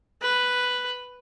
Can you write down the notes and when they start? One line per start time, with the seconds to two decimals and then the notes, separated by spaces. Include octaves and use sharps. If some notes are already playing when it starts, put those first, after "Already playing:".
0.22 B4